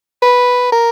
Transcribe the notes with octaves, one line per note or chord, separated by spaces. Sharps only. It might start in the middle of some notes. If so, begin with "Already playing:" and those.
B4
A#4